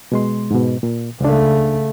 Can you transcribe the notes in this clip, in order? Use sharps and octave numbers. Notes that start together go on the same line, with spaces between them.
B2 G#3 C6
G#2 B2
A#2
C#2 C#3 A3 D4